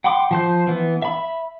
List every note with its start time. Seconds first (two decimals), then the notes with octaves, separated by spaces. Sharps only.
0.04 F#5 G5 B5 C6 D6
0.31 F3 C5 G6
0.67 E3 B3
1.02 E5 B5